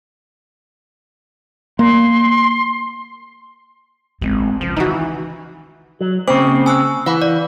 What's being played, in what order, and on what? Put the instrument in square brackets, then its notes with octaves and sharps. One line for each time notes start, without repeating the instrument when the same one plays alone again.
[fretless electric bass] A#3 [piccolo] C6
[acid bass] A1 [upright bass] G#3 C4
[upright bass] C#2 [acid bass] F3
[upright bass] D#3 [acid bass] E3 [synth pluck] D#4 F#4
[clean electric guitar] F#3
[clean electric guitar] C#3 C4 [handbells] A#3 C5 D6
[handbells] G#5 E6 F#6
[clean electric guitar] E3 [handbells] F5 F#5 B5
[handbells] D5